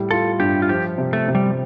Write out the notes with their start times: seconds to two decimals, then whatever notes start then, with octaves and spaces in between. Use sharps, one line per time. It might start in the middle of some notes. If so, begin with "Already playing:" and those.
Already playing: A2 G3
0.11 F4 A4
0.40 G2 G4
0.62 F4
0.69 F3 G4
0.98 C3
1.13 A3
1.28 C3
1.35 G3